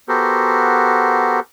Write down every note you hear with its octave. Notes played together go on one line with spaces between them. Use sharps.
B3 F#4 G4 A4 A#4 C5